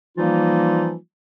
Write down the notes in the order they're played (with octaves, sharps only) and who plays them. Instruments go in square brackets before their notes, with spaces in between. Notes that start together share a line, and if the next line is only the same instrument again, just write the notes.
[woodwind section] E3 F3 G3 A#3 D#4 F4